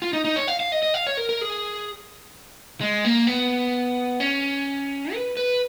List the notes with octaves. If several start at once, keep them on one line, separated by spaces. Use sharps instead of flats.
F4
D#4
D#4
C#5
F5
F5
D#5
D#5
F5
C#5
A#4
A#4
G#4
G#3
A#3
B3
C#4
B4
B4